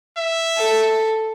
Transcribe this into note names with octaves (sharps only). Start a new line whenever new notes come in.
E5
A4